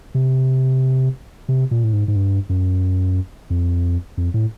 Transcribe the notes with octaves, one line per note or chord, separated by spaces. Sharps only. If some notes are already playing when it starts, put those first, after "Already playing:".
C3
C3
A#2
A2
G#2
G#2
G2
F#2
F2
F2
A2